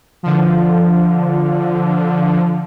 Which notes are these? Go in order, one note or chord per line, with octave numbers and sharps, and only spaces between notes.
D3 F3